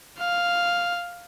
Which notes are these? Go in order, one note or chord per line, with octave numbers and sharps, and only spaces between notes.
F5